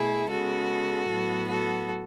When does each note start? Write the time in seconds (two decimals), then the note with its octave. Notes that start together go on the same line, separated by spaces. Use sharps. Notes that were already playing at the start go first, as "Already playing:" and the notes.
Already playing: B2 A3 E4 G#4
0.30 C#3 G#3 B3 F#4 A4
1.10 A2 F#3 B3
1.48 F#4 A4